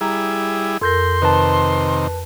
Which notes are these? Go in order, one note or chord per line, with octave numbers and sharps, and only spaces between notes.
G3 E4 G#4 A#5
F2 A4 A#4 C6 G6 A#6
C3 D#3 B4 A5